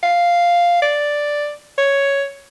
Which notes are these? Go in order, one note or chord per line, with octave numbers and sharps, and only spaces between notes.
F5
D5
C#5